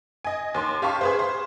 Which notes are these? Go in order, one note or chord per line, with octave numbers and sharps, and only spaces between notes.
D#5 G#5
D#2 C6
G4 F5 A5 C#6 F6
G#4 B4 C5
C5